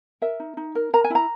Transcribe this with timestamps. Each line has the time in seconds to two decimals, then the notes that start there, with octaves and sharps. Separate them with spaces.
0.22 A#4 E5
0.40 D#4
0.57 D#4
0.75 A#4
0.93 A#4 A#5
1.04 G#5
1.10 E4 A#5